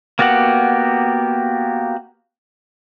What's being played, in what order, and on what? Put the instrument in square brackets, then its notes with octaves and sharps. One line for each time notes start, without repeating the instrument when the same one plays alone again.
[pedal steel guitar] A#3 B3 F#4 G4 F#5